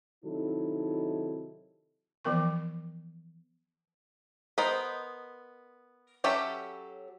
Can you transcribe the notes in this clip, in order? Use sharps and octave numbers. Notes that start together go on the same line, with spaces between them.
C3 D#3 F#3 D#4 E4 A4
E3 F3 B3 A#4 C#6
B3 A#4 C5 D#5 B5
F#3 C#4 G4 A4 E5